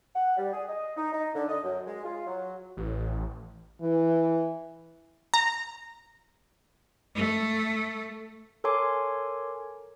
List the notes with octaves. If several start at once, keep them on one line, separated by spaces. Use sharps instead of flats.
F#5
G3
G#4
D#5
D#4
D#4
D3
D#5
F#2
G#3
F4
F#3
A1
E3
A#5
A3
A4 A#4 C#5 G#5 C6 D6